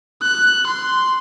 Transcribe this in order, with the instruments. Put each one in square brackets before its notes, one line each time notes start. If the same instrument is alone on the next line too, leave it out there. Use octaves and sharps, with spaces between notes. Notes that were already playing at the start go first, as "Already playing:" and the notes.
[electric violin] F#6
C6